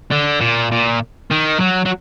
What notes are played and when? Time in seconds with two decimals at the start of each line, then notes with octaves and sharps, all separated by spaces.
0.11 D3
0.41 A#2
0.72 A#2
1.31 D#3
1.60 F#3
1.86 F#3